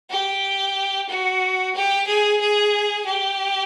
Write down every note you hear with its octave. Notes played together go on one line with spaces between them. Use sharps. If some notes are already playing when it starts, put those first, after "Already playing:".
G4
F#4
G4
G#4
G#4
G4